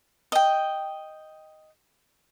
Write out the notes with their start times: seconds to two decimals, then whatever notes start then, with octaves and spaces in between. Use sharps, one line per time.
0.32 D#5 G5